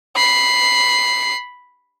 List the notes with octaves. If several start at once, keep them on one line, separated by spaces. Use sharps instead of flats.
B5 C7